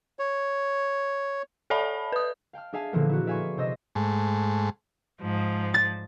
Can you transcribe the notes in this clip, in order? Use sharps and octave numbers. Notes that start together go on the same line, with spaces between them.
C#5
A4 D5 E5 A5 B5
B4 D#6
F5 G5 A5 F6
D4 G#4 E5 F5 G#5 A5
A#2 D3 E3 F3 A#3 B3
E4 F#4
D5 E5 F5 G#5 B5 C#6
C3 D4 C5 D#5 E6 A#6
G#2 A3
G#2 F3
A6